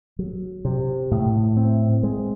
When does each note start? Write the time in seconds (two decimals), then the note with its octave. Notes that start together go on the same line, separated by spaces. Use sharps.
0.19 F#3
0.65 C3
1.11 A2
1.57 C4
2.03 G#3